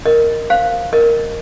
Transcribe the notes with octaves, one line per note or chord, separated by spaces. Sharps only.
A#4 D#5
C5 F5
A#4 D#5